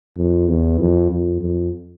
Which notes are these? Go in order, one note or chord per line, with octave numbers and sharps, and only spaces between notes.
F2
E2
F2
F2
F2